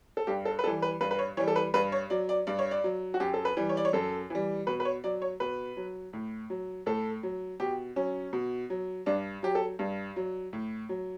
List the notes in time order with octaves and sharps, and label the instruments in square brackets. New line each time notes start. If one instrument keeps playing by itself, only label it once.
[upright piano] A4
G2 G4
A4
B4
E3 G3 A4
B4
G2 B4
B4
C#5
E3 C#5
G3
A4
B4
G2 B4
C#5
F#3 D5
D5
G2 D5
C#5
D5
F#3
F#4
F#2 G4
A4
B4
E3 G3
C#5
D5
C#5
F#2 A4
E3 G3
B2 B4
B4
C#5
F#3 D5
C#5
B2 B4
F#3
A2
F#3
A2 A4
F#3
B2 G4
F#3 C#4
B2
F#3
G2 D4
F#3 G4
A4
G2
F#3
A2
F#3